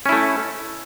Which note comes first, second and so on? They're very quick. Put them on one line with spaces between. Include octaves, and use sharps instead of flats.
C#4 E4 A3